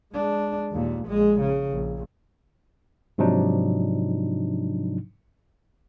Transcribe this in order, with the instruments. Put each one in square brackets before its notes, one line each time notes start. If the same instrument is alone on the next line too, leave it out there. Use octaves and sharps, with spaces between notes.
[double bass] G#3 D4
D#2 A#2
A#1 G#3
C#3
A#1
[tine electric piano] G#2 C3 F3 F#3 D4 D#4